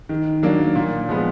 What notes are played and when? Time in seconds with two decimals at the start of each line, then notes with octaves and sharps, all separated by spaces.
0.09 D#3
0.43 F#3 A#3 D4
0.76 A#2
1.09 F3 G#3 B3